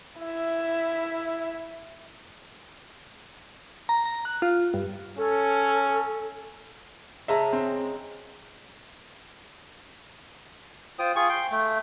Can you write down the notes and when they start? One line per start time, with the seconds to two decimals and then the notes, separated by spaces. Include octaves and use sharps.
0.20 E4 E5
3.89 A#5
4.05 A#5
4.25 F#6
4.42 F4
4.74 G2
5.18 C#4 A4
7.28 C#3 G#3 E5 A5 A#5
7.53 C4
10.99 F4 C5 G5 D#6
11.16 F4 G#4 G#5 C#6
11.29 G5 C6
11.51 A3